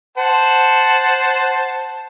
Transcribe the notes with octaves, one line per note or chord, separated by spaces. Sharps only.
C5 F#5 A5